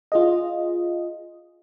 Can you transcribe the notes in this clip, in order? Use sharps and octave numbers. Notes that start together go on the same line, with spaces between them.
F4 G#4 D#5